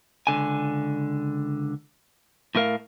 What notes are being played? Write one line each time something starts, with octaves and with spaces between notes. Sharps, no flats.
C#2 D3 G#5
A2 A3 A#4 F5